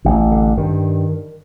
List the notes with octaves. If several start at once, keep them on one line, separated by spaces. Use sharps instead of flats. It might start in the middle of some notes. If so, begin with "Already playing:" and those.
A1 D3
D3
G2 D#3